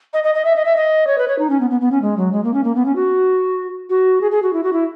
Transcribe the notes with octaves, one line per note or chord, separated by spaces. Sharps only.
D#5
D#5
D#5
E5
D#5
E5
D#5
C#5
B4
C#5
D#4
C#4
B3
B3
B3
C#4
G#3
F#3
G#3
A#3
C#4
A#3
B3
C#4
F#4
F#4
G#4
G#4
F#4
E4
F#4
E4